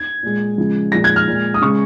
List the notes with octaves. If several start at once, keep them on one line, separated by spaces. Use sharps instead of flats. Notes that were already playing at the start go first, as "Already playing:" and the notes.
Already playing: G#6
A#2 G#3
C#3 F3 G#3
A#2 F3 G#3 A#6
G#6
F6
A#2 G#3
D#6
C#3 G#3 C#6